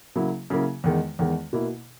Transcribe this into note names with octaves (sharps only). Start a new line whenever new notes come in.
C#3 F#3 A#3 E4
C#3 F#3 A#3 E4
E2 D#3 G#3
E2 D#3 G#3
B2 A#3 E4